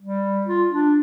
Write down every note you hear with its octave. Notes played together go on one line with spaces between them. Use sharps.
G3
F4
D4